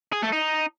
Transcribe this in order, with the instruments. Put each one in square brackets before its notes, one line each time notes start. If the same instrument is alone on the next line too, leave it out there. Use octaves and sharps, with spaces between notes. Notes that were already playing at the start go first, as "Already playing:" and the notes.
[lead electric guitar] G#4
A3
D#4